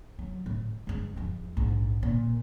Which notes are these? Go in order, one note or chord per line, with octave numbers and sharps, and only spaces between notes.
F#3
A2
G2 G#3
E2 F3
A#1 G#2
A#2